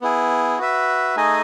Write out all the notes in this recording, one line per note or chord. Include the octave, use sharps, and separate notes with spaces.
B3 E4 G#4
F#4 B4 E5
A3 D#4 G#4 D#5 G#5